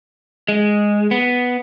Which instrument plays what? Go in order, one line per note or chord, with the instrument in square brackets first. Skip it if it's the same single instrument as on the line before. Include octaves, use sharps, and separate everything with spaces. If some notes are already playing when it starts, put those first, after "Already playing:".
[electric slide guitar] G#3
B3